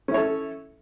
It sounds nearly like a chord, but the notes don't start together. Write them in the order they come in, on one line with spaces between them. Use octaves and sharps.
C#4 E4 C#5 A4